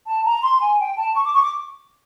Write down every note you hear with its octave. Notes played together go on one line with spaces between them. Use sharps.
A5
A#5
C6
G#5
G5
A5
C#6
D6
C#6
D6